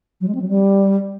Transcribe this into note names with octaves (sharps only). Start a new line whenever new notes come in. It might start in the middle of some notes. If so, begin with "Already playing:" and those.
F#3
G#3
C4
F#3
G3